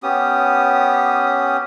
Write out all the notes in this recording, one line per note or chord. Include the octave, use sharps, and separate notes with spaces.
B3 C#4 G4 D#6